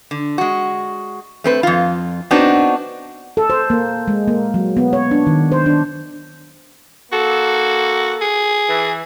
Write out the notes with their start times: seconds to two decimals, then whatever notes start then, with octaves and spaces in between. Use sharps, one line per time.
0.11 D3
0.38 G#3 F#4
1.44 A3 C4 B4
1.63 F2 F4
2.31 B3 C4 D4 D#4 F#4
3.37 A4
3.50 C5
3.70 A#3
4.08 G#3
4.28 A#3
4.54 F#3
4.77 B3
4.93 C#5
5.11 D4
5.27 D#3
5.52 C5
5.66 D4
7.12 A#3 F#4 A4
8.21 G#4
8.69 E3